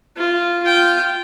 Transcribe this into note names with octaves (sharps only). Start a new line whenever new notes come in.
F4
F4 G5